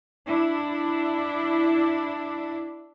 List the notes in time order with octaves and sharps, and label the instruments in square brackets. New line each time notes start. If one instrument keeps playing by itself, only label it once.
[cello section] D4 E4